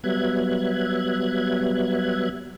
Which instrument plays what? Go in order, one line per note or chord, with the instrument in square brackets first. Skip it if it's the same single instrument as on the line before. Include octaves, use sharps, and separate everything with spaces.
[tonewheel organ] F#3 G3 B3 E5 F#6 G#6